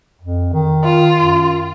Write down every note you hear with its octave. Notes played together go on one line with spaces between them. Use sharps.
F2
D#3
F4
F#2